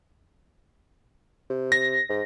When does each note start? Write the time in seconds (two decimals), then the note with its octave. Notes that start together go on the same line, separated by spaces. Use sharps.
1.50 C3
1.72 A#6
2.09 G#2